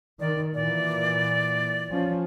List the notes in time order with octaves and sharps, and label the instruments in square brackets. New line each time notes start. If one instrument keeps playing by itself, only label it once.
[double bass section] D#3 [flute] D5
[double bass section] A#2 E3 [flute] D5
[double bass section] F3 C#4